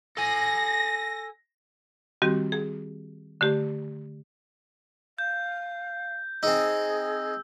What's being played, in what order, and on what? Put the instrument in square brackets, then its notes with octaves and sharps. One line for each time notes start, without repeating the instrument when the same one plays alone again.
[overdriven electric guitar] A4 G#5 [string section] A#6
[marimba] D#3 G3 C4 F#4 G4
G#4
D3 A3 G4
[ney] F5 [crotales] G6
[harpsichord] C4 D#4 [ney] G#4 [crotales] E6